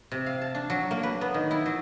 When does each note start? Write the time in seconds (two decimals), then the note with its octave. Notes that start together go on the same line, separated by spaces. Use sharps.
0.12 C3
0.26 F5
0.41 A5
0.55 D4
0.70 F#3
0.91 A#3
1.03 B4
1.21 B3
1.34 D#3
1.51 E4
1.66 F#3